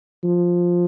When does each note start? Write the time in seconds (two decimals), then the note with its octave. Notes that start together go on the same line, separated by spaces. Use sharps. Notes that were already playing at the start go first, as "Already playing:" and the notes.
0.24 F3